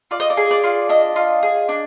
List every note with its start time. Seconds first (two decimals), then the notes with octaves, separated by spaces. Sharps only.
0.11 F4 D5
0.20 D#5
0.30 D5
0.37 G#4
0.51 D5
0.63 F4
0.89 D4 D#5
1.16 F4
1.43 G#4
1.69 D4